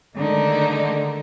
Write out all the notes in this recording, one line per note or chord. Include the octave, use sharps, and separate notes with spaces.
D3 D#3 G#3 A3 D4 D#4